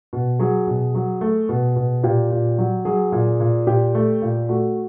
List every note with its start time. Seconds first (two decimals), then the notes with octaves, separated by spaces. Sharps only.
0.13 B2
0.39 F#3 G#4
0.67 B2
0.95 F#3
1.21 A3
1.49 B2
1.76 B2
2.03 A#2 G4
2.31 A#2
2.58 F#3
2.85 F#3 G#4
3.12 A#2
3.40 A#2
3.67 A#2 G4
3.95 A3
4.22 A#2
4.49 A3 F#4